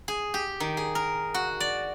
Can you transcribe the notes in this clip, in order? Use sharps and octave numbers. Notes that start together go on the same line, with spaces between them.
G#4
G4
D#3
G#4
A#4
F#4
D5